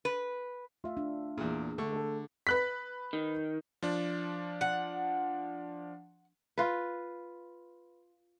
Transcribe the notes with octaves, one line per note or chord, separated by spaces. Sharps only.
B4
A3 F4 E5
D4
E2 A#2 G#4
D3 A3 C#6
A3 A4
B4 F#6 B6
D#3
F3 D4
F#5
F4 B4